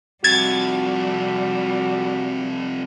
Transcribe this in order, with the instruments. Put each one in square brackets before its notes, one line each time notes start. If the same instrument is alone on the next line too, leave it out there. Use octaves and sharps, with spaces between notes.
[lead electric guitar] F2 C3 [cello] G3 [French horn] F#4 [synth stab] G#6 A6